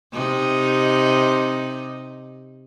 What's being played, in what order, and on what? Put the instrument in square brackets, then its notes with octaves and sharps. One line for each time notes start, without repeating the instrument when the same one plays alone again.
[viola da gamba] C3 D#4